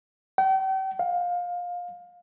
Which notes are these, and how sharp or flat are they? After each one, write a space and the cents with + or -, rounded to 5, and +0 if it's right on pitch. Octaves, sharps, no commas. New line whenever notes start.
G5 -40
F5 +20